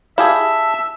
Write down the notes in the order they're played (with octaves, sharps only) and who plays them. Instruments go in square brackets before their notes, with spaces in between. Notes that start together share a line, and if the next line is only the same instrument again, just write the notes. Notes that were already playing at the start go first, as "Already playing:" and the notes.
[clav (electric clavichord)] E4 G4 G#4 [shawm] E5 [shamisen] F5 [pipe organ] A5